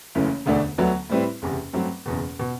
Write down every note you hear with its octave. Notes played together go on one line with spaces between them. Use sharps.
F#1 F#2 E3 A3
E1 D2 D3 A3 D4
D2 D3 F#3 B3
A2 G3 C4 E4 B4
F#1 E2 C3
G2 F#3 A3 C4 G4
F#1 E2 B2
B2